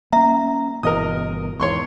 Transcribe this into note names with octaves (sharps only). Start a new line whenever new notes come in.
A#3 C#4 E5 A#5
G1 B2 E3 A#4 D#5 D#6
E2 G#2 C#5 C6 C#6